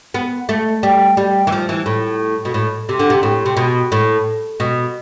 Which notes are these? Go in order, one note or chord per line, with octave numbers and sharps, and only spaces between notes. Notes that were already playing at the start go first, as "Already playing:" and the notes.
B3
A3
G3
G3
E3
F3
E3
A2
B2
A2
C3
D3
C3
A2
C3
B2
A2
B2